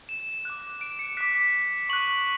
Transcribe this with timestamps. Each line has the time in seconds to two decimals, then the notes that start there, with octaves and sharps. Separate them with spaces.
0.09 E7
0.45 D6 F#6
0.81 D7
0.99 C#7
1.17 D6 F#6 B6
1.35 B6
1.89 C#6 F#6 F#7